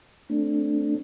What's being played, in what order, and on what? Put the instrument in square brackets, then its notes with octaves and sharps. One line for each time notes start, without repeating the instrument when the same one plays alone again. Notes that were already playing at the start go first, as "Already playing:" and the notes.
[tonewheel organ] A3 C4 D4